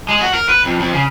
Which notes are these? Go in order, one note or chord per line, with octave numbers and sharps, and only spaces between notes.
G#3
F#4
A#4
B4
F2
F2
C#3